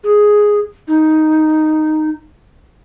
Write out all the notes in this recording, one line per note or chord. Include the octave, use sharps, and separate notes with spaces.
G#4
D#4